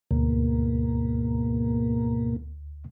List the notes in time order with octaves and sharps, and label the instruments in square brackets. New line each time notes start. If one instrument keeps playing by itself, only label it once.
[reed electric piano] D2 [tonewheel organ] G#2 B2 A#3